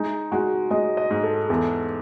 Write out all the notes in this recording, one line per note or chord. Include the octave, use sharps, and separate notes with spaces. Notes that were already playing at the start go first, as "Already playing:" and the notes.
Already playing: G#3 D#4
G#3 F#4
G#3 D#5
D#5
G#2
A4
E2 A4